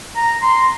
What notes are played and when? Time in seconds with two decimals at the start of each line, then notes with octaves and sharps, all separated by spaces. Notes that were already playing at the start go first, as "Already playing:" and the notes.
0.17 A#5
0.42 C6